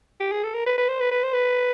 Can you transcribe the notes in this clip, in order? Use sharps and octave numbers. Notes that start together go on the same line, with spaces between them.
G4
G#4
A4
A#4
B4
B4
C5
B4
B4
C5
B4